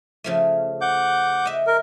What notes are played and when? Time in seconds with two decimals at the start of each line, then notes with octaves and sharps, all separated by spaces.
0.24 C#3 F3 A3
0.81 F#5 D6 G6
1.45 D#5 E5
1.67 A#4